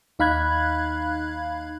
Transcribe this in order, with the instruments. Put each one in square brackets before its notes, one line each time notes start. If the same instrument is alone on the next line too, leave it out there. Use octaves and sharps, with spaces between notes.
[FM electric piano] D#2 D#4 F5 B5 F#6 G#6